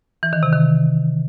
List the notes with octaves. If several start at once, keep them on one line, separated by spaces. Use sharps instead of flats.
E3
D#3
C3
D#3